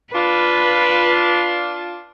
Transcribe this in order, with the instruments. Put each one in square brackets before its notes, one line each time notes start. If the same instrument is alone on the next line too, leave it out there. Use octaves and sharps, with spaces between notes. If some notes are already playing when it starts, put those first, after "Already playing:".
[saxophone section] D4 F4 [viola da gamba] B4